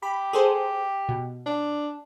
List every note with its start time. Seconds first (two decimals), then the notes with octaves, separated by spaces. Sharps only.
0.02 G4 B5
0.33 G#4 A4 C5
1.09 B2
1.46 D4